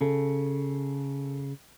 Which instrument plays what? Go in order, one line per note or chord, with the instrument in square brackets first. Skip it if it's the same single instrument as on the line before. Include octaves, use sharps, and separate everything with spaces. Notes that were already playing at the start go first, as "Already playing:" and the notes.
[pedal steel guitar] C#3 [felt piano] A4